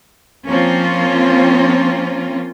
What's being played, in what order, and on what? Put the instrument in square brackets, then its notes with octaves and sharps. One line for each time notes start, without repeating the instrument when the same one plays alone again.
[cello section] F3 A#3 C4 C#4 F4